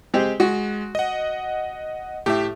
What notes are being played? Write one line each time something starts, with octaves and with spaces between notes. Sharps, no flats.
G#3 C4 G4
G#3 F#4
D#5 F#5
A2 G4 E5